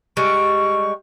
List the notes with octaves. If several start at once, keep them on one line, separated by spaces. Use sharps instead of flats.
G3 G#3 C#6